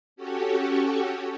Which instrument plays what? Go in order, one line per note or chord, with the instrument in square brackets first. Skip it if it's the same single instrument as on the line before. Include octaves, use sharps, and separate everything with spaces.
[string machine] C#4 F#4 G4 A4 C#5